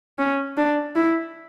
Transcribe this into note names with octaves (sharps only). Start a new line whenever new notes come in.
C#4
D4
E4